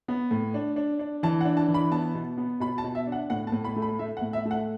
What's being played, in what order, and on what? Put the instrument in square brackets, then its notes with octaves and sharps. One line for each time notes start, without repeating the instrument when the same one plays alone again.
[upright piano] B3
A2
D4
D4
D4
E3 A5
F#5
D4
A5
E3
B5
B3 A5
B2
B3
B2 B5
A5
B2
E5
D4
F#5
A2 F#5
A5
A2
B5
A3
B5
A3 E5
F#5
A2
E5
A3
F#5